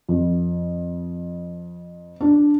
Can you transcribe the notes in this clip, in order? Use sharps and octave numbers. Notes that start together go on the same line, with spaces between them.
F2
D4